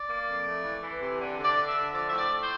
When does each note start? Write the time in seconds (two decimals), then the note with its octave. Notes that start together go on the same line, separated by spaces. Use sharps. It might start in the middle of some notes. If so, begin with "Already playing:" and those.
Already playing: D5
0.08 A#3
0.27 F2
0.45 A3
0.64 E3
0.82 E3
1.01 C3
1.19 D3
1.38 D3
1.44 D5
1.56 D4
1.68 E5
1.74 D3
1.92 F3 D5
2.09 A2 E5
2.17 D5
2.29 A2
2.42 C5